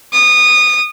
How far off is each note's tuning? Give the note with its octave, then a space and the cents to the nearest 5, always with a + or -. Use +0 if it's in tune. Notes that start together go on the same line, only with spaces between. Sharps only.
D#6 -20